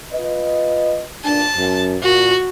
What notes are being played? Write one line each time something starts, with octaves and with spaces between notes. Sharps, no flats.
F4 B4 D#5
G2 A#2 D4 A5
F#2
A#2 F#4